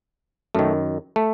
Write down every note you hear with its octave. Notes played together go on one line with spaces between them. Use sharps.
F#2 D#3 A3
A3